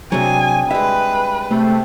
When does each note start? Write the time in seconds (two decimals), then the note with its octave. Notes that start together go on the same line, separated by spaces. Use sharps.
0.12 C3 F#3 C4 D4 G#4 G#5
0.71 G3 G#3 B4 E5
1.51 C3 A3